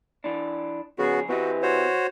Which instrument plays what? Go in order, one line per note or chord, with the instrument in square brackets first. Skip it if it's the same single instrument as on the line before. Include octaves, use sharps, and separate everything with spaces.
[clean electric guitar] E3 D4
[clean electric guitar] F2 G#4 [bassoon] C#3 [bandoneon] B3 F#4
[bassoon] E3 [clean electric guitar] C4 G4 D#5 [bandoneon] F#4
[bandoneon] F#4 C5 C#5